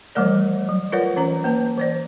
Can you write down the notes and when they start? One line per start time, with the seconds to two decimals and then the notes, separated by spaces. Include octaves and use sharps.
0.15 E3 F3 G3 A3 A#4 D5
0.69 F#3
0.92 F4 A#4 B4 C#5 D5 F#5
1.16 E3 C#4 A#5
1.44 A#3 B4 A5
1.78 E3 C5 D5